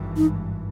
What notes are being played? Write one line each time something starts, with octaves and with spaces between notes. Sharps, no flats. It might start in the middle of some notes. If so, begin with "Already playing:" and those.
Already playing: G#1 G2 E3
D#4